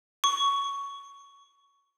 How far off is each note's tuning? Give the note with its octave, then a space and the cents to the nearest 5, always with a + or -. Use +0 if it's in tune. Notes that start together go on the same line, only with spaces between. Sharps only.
C#6 +10